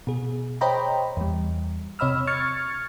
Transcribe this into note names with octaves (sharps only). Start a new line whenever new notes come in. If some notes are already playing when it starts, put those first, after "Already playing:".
B2 G#4
C5 C#5 D#5 G5 A#5 B5
E2 G3
C3 C#5 D#5 B5 E6 F6
C#6 F6 G#6 A6 C#7